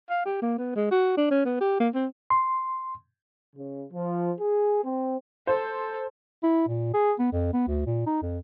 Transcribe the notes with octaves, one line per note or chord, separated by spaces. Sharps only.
F5
G4
A#3
B3
G#3
F#4
D4
C#4
B3
G4
A#3
C4
C6
C#3
F3
G#4
C4
A4 C5
E4
A#2
G#4
B3
F2
B3
D2
A#2
D#4
F2